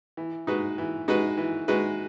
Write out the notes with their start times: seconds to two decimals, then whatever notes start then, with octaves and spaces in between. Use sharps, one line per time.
0.17 E3
0.47 G#3 D#4 F#4 B4
0.78 E3
1.08 G#3 D#4 F#4 B4
1.38 E3
1.68 G#3 D#4 F#4 B4